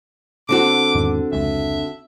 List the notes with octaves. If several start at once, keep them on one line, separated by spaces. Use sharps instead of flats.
D3 C4 F#4 D6
E2 G#2 D#3
F1 C#2 E5